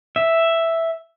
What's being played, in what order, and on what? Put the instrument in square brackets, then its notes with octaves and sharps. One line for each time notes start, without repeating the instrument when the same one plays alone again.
[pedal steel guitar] E5